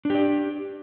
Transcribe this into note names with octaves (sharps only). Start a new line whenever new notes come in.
D4 G4 D5